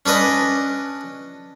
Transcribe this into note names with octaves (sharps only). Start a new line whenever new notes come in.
C#4 D4 B4 D#5